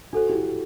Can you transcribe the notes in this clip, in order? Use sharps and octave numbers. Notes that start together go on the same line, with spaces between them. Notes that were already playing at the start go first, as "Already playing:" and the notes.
D4 F#4 A4 C5
E4 G4